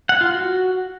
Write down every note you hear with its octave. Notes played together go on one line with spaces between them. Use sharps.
F#5
F4
F#4